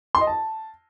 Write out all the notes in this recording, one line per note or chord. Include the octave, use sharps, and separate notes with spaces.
C6
D#5
A5